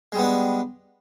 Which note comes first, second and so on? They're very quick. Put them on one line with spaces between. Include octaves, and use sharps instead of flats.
G#3 G3 B3 D4